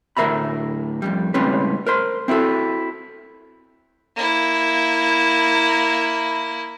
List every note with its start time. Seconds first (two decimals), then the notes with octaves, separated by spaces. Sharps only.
0.17 D2 A2 A#4 E5 A#5 B5
1.02 F2 G#2 G3
1.34 C#2 A2 G3 C4 C#4 B4
1.86 A#4 C5 C6
2.28 C4 E4 F#4 A4 E5
4.16 A#3 E4